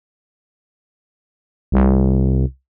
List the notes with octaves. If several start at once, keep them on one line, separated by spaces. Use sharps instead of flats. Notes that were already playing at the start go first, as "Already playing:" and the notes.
C2